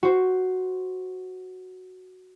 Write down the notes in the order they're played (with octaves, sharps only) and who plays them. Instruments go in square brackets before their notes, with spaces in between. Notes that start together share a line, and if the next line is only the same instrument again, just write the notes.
[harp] F#4 C5